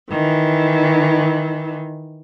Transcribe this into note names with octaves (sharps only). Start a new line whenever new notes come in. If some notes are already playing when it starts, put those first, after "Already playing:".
D#3 E3